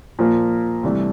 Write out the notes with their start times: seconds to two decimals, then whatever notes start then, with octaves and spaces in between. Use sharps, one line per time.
0.19 A#2 F3 A#3
0.83 C2 C3 E3 A3 D4